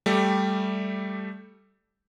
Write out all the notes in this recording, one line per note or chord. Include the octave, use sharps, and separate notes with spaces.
G3 A3 G4